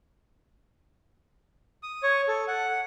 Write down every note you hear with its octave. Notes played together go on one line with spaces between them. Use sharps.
D#6
C#5
A4
F#5